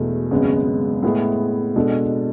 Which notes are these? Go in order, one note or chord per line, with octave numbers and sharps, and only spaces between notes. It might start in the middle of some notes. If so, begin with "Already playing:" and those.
Already playing: E1 E2 B2 A3
G#1 F#2 C#3 G#3 B3
A2 G#3 B3 E4 G#4
B2 G#3 D4 A4